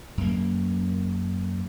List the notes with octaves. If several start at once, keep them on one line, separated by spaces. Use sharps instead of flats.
F#2 A#3